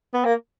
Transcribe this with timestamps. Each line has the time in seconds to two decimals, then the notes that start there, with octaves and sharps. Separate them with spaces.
0.14 B3
0.25 A#3